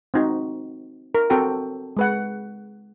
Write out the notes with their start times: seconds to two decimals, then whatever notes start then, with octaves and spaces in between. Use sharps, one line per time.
0.14 C4 D#4 F#4
1.15 A#4
1.30 C4 F#4 A4 G5 A#5
1.97 G#3 B4 F#5